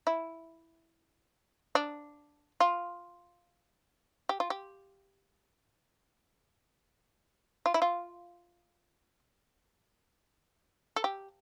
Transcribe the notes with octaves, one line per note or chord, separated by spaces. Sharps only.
E4
D4
F4
G4
F4
G4
F4
E4
F4
A4
G4